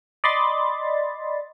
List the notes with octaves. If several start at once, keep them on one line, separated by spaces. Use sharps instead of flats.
D5 D#5 B5 C6 A6